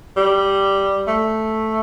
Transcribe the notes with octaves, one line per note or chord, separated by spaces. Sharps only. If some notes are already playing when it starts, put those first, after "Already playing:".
G3
A3